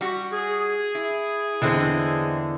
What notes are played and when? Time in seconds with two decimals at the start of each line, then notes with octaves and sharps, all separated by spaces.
0.01 G3 F#4
0.32 G#4
0.95 E4
1.62 E2 D3 G#3 C4 D4